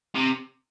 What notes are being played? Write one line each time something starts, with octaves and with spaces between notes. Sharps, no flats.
C3